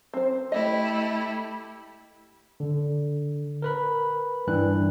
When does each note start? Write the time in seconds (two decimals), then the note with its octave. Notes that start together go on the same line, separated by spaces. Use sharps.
0.14 C4 C5
0.52 A3 E4 G4 D#5
2.60 D3
3.62 A#4 B4 B5
4.47 G2 E3 D4 F#6